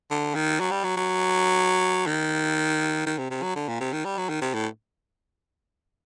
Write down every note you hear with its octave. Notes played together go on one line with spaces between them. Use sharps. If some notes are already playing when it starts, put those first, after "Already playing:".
D3
D#3
F#3
G3
F#3
F#3
D#3
D#3
C3
C3
F#3
D3
A#2
C3
D#3
G3
F#3
D#3
C3
A2